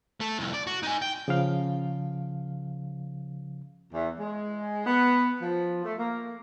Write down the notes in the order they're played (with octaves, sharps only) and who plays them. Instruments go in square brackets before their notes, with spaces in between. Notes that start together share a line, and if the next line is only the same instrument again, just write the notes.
[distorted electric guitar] A3 A4
C2 F2
D5
F#4
D#4 G#5
G5
[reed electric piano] C#3 F3 F5
[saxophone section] E2
G#3
B3
F3
A3
A#3